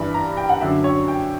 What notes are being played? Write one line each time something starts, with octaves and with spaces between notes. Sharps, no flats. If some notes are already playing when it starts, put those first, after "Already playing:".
Already playing: G2 E3 B5
A#5
G5
F#5
F#2 D3 F#3 E5
C#5
G5